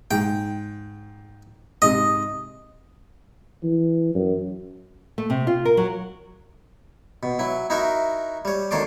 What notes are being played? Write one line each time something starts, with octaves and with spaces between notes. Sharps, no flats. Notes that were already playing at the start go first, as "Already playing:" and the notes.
G#2 G5
G#2 C3 D#5
E3
F#2
A3
C3
F4
A#4
F#3
B2
F#3 E4
D#4 E4 F#4 A#4 E5
G3 C#5
D2 D#3 C#5 A5 C6 D6